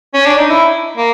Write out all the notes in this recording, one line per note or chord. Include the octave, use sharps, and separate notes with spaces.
C#4
D4
D#4
E4
A#3